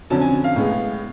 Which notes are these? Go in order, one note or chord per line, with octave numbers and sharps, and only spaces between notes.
F2 D3 F#3 C#4 A5
G#5
F5
A2 G#3 B3